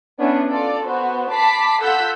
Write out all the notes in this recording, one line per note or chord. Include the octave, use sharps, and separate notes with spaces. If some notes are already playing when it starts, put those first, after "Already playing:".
B3 C#4 D4 E4
F4 A4 D5
B3 F#4 C5
A5 B5 D6 B6 C7
F4 A4 F#5 E6 G6 B6